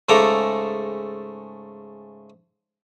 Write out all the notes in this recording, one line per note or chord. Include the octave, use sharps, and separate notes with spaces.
G#2 C#3 A3 A4 A#5 D6